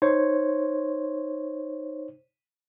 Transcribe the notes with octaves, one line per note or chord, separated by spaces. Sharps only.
D#4 C5 C#5